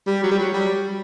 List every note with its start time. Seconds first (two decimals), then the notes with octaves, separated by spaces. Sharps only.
0.07 G3
0.24 F#3
0.32 G3
0.39 F#3
0.54 G3